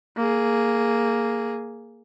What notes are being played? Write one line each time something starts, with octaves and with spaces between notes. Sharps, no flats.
A#3 G#4